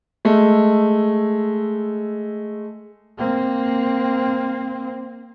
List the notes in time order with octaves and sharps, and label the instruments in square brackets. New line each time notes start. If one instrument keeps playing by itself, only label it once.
[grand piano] G#3 A3
[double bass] A#3 C4